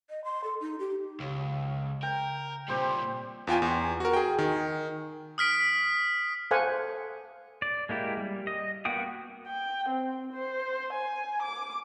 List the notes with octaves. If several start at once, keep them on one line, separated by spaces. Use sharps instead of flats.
D#5
C6
A4
D#4
G4
C#2 C#3
A#4 G5
A#2 G3 C4 G4 C5
E2 F4 G5 G#5
E2 C6
F#4 A#4
G#4 G5
D#3
D#6 F6 B6 D7
A4 C5 F5 F#5 G#5
D5
G#3 A#3 E4 G4
G3
D#5
A#3 B3 F#4 G5 D#6
G5
C4
C5
G#5
D6